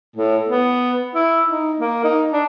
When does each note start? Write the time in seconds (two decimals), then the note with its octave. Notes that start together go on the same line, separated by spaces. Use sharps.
0.16 A2
0.49 B3
1.15 E4
1.48 D#4
1.80 A#3
2.04 D#4
2.32 D4